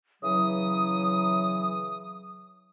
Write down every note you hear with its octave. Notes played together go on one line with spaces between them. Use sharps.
C#3 E3 F#3 D#6